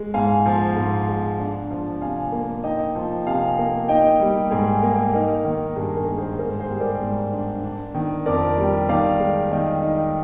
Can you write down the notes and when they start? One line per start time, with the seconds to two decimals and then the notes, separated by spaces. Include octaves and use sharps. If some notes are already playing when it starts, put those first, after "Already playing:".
Already playing: G#3
0.14 G#2 F5 G#5
0.46 F3
0.76 G#2
1.08 G#3
1.39 D4
1.71 F3
2.01 C3 F5 G#5
2.32 A#3
2.64 D#4 D#5 G5
2.95 F3
3.26 C3 F5 G#5
3.58 A#3
3.88 D#4 D#5 G5
4.20 G3
4.51 G#2 G#4
4.83 A#3
5.14 D#4 A#4
5.44 D#3
5.76 G2 G#4
5.97 A#4
6.08 G#3
6.18 G#4 C5
6.39 G#2 A#4
6.59 G#4 C5
6.70 G3
6.80 A#4 D5
7.01 G#2
7.32 D4
7.64 D4
7.94 D#3
8.26 F2 A#4 D5
8.58 G3
8.89 D#3 D5 F5
9.19 G#3
9.51 D#3 D#5 G5
9.82 D#4